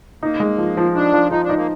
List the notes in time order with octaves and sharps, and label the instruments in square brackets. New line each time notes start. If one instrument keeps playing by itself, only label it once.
[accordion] A#3 [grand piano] D#4
[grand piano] G#3
F3
F3
[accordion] D4 [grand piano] D#4
[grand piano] F3
[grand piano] F3 [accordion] D#4
[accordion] D4
[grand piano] D#4
[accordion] A#3